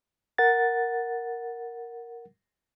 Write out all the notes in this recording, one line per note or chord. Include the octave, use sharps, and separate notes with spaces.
A#4 F#5 A6